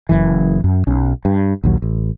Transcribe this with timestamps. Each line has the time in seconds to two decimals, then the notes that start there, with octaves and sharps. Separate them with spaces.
0.09 F#1 F#2 E3
0.64 F#2
0.87 B1 C#4
1.25 G2
1.63 A#1 D#2 F#3
1.82 A1